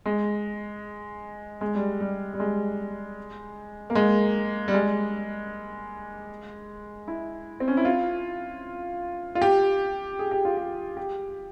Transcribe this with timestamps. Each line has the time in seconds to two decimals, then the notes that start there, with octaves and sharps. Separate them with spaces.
0.06 G#3
1.61 G#3
1.75 G3
2.00 G3
2.33 G3
2.40 G#3
3.90 A#3
3.95 G#3
4.68 G3
4.74 G#3
7.08 E4
7.60 C4
7.68 C#4
7.77 E4
7.85 F4
9.35 F4
9.42 G4
10.19 G#4
10.31 G4
10.45 F4
10.57 G4
10.97 G4